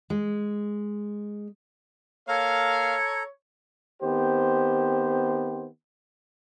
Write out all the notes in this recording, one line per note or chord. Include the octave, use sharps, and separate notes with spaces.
G#3
A#3 A4 C#5 F5 A#5
D#3 B3 C4 G4 C5